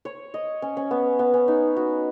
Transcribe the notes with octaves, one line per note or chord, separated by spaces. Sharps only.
C#5
D#5
C#4
C#4
B3
B3
C#4
D#4
F#4